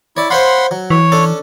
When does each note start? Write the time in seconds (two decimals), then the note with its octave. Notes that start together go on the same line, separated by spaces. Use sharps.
0.17 E4 C#5 D5
0.30 C5 C#5 F5 F#5 B5 C6
0.71 F#3
0.90 E3 C#5
1.12 C#4 D4 A4